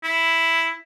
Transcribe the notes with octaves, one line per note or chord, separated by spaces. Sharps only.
E4